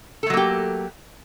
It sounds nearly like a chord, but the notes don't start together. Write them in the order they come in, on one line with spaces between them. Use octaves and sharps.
A4 A3 F#3 A#3 G4